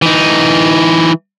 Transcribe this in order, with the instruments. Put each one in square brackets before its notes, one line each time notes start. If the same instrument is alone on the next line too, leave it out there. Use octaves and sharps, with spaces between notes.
[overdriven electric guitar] E3 D#4